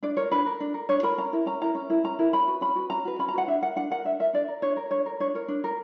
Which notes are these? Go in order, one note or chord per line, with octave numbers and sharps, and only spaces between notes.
D4 D5
A#4 C#5
D4 B4
A#4
D4
A#4
D4 C#5
A#4 B5
C#4 A#5
E4 A#4
C#4 A#5
E4 A#4 A#5
C#4
E4 A#4
C#4 A#5
E4 A#4
C#4 B5
F#4 B4
C#4 B5
F#4 B4
C#4 A#5
F#4 B4
C#4 B5
A#5
F#4 B4 F#5
D4 E5
A#4 F#5
D4 F#5
A#4 F#5
D4 E5
A#4 E5
D4 D5
A#4
D4 C#5
A#4
D4 C#5
A#4
D4 C#5
A#4 C#5
D4
A#4